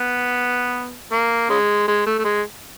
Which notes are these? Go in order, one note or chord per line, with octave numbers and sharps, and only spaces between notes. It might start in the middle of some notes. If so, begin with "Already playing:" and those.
Already playing: B3
A#3
C#3 G#3
G#3
A3
A3
G#3